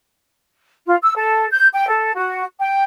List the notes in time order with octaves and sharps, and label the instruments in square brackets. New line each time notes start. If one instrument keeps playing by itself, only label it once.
[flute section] F4
E6
A4
G6
G5
A4
F#4
G5